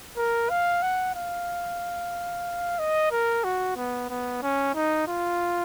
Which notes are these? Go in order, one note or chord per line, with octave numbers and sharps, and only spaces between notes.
A#4
F5
F#5
F5
D#5
A#4
F#4
B3
B3
C#4
D#4
F4